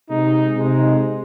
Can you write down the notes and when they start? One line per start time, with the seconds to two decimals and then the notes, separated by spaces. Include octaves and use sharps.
0.09 C3 G#3 D#4
0.56 C3 G#3 D#4